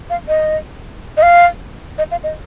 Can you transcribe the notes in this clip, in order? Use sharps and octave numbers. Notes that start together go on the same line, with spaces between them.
F5
D#5
D#5
F5
D#5
F5
D#5